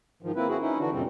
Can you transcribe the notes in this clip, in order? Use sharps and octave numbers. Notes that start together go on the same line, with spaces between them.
G#2 D#3 F3
A#3 C4 E4 B4
C4 E4 F#4 G#4
C#4 D#4 E4
D3 E3 D4 F#4
F#2 A#2 C#3 G3 C4